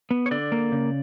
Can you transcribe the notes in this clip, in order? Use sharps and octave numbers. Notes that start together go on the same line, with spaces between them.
B3
C#5
D3 D5
A#3
C#3